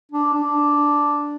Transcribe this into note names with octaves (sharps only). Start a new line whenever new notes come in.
D4
D4